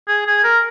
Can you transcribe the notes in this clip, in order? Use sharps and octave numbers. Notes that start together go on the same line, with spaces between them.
G#4
G#4
A#4